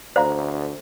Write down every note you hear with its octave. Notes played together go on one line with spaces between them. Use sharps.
D2 C5 D5 F5 A#5